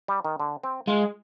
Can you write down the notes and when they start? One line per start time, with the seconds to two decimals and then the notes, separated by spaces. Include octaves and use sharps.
0.08 G3
0.25 D#3
0.40 D3
0.64 C4
0.87 G#3 F4